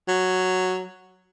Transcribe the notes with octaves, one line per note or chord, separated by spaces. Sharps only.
F#3